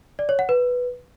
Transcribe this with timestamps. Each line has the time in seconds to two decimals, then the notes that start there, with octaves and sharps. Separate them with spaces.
0.19 D5
0.29 C#5
0.39 F#5
0.49 B4